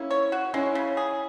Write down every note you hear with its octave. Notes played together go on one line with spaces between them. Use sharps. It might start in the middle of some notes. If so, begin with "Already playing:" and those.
Already playing: A#3 C#4 E4
C#5
F#4
G#3 C#4 E4
C#3
G#4